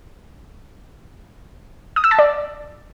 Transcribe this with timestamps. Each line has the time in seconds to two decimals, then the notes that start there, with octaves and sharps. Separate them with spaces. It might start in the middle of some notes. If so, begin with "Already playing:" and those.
1.96 D#6
2.04 E6
2.11 A5
2.19 D5